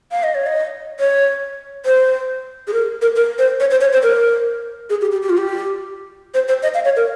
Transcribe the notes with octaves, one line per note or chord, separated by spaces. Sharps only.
F5
D#5
C#5
D#5
C#5
C5
G#4
A#4
A#4
A#4
C5
C#5
C5
C#5
C5
A#4
G#4
G4
G4
G4
F4
G4
C5
C5
D#5
F5
C#5
A#4